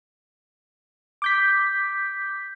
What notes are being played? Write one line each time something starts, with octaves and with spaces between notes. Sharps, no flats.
D6 G6 B6